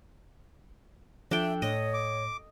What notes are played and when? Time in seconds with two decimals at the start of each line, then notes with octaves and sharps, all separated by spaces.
1.31 F3 D4 A4 E5 G5
1.62 A2 C#5 D#5
1.94 D6